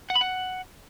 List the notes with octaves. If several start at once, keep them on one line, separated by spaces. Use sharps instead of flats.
F#5
B5
F#5